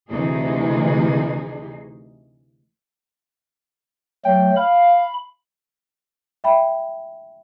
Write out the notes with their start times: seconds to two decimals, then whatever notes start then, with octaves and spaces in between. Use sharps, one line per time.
0.11 D2 C3 E3 A3 D#4 G#4
4.25 F#3 A3 G5
4.57 F5 B5
6.44 E5 G5 B5